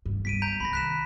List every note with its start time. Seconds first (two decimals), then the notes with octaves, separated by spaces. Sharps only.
0.06 G2
0.25 G1 G3 B6 D7 D#7
0.42 A#5 G6 D7
0.60 C2 D#3 B5 A#6
0.73 F#6 B6 E7